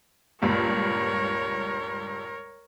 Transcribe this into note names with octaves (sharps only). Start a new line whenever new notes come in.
C#2 G2 A#2 A#4 C#5